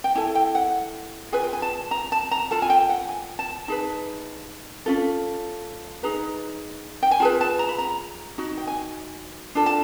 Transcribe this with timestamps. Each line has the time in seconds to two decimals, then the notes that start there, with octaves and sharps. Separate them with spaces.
0.04 G5
0.15 E4 A4 G#5
0.35 G5
0.55 F#5
1.32 F4 G#4 B4 G#5
1.43 G5
1.53 G#5
1.62 A5
1.91 A#5
2.12 A5
2.31 A#5
2.51 F4 A4 A5
2.62 G#5
2.70 G5
2.89 F#5
3.09 G#5
3.39 A5
3.68 D#4 G#4 B4 A5
4.86 C#4 F4 A4
6.03 D#4 G#4 B4 A#5
7.03 G5
7.11 G#5
7.20 F4 G#4 B4 A5
7.41 A5
7.59 A#5
7.69 B5
7.78 A#5
8.38 D#4 F#4
8.58 G5
8.67 G#5
9.55 D4 F4 A4
9.66 A5